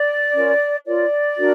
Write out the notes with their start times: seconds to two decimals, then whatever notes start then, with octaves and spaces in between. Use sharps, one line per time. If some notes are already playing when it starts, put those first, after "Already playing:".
Already playing: D5
0.33 C#4 F4 A#4 C#5
0.85 F4 A#4 C#5 D5
1.37 D4 F#4 A#4